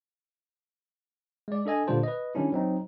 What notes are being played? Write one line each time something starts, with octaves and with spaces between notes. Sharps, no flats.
G#3 D5
D4 A4 D#5 G#5
A#2 D3 G3 F4 C5 A5
B4 D#5
D#3 G3 C#4 D4 E4
F#3 C4 D#4